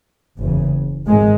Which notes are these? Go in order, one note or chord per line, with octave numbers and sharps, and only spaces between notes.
F#1 E2 C#3
G#1 G#2 G#3